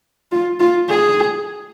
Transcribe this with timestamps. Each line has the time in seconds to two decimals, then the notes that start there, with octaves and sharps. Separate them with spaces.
0.32 F4
0.60 F4
0.89 G#4